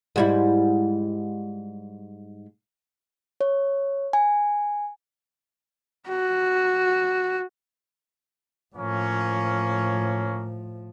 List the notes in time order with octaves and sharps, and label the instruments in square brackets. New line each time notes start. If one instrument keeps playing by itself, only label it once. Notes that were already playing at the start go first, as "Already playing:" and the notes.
[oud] G#2 G3 E4
[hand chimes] C#5
G#5
[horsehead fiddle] F#4
[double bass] A2 F3 [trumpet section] A#3 C#4 C#5